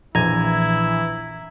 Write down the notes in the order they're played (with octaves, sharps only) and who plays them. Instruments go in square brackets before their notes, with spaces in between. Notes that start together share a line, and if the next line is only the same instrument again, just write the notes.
[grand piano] A#1 D#7 [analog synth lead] E3 [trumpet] E4 [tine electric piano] A#5 G#6